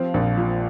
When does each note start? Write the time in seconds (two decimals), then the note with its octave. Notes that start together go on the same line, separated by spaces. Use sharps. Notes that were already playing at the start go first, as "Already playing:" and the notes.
Already playing: F3 C4 F5
0.14 A#1
0.37 A#2